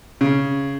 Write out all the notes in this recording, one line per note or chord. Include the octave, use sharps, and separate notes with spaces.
C#3